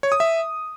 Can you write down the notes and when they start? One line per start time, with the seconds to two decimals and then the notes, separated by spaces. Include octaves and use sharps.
0.03 C#5
0.12 D#6
0.20 E5